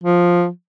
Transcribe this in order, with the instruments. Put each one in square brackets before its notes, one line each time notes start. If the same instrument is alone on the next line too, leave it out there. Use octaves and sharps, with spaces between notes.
[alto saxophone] F3